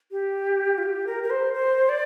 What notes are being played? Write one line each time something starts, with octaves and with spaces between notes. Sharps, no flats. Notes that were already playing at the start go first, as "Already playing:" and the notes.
G4
F4
G4
A#4
A#4
C5
C5
D5